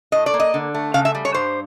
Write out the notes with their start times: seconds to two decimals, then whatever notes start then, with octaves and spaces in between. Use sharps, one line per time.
0.12 A2 D#5
0.26 D5
0.34 A#3
0.40 D#5
0.54 D3
0.74 A3
0.94 C#3 F5
1.05 E5
1.15 G3
1.25 C#5
1.34 G2 C5